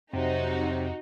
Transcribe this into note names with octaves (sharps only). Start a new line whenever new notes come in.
F2 C3 F#3 D#4 F#4 C5